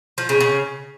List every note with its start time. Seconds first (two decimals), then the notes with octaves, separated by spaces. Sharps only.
0.18 F3
0.29 C#3
0.41 C#3